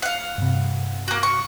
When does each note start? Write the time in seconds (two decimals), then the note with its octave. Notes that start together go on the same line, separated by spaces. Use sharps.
0.02 F5 F#5
0.38 G2 C3
1.08 A#3 F#4
1.23 C#6